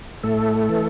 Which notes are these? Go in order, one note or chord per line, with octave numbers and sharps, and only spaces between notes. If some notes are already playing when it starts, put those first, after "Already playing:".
A2 A3 A4
E3